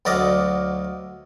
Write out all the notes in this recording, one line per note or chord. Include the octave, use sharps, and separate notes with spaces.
D2 F#3 D5 D#5 F5